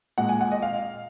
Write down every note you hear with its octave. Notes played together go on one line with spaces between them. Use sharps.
A#2 G#3 F#5
G#5
F#5
D#5
F5